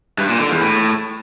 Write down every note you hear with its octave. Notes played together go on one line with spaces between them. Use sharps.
G2
A#2
D3
E2
A2